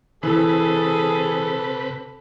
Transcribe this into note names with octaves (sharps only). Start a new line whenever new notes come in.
C3 E3 G#4 A4 B4